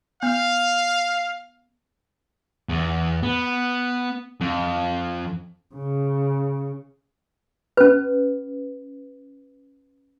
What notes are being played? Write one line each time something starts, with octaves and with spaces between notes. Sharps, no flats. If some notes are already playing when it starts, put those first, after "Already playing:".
B3 F5
E2
B3
F2
C#3
C#4 B4